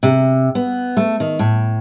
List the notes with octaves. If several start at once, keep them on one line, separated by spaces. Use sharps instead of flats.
C3
B3
A3
D#3
A2